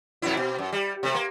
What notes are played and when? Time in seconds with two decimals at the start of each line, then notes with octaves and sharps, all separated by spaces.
0.22 F2 B2 E4
0.37 B2
0.58 F#2
0.72 G3
1.03 C3 A3
1.15 A#3